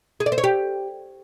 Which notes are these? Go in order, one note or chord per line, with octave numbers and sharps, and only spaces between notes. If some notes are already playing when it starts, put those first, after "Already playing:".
G#4
D5
C5
C#5
G4